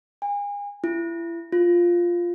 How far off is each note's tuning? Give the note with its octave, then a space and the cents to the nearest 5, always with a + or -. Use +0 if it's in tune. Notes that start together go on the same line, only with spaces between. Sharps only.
G#5 -35
E4 +35
F4 +0